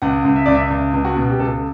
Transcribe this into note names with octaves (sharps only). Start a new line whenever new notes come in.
C#2 F#5
C#2
E5
C#2 D5
E5
C#2
C#2
F#4
B2
G4
C#2 A4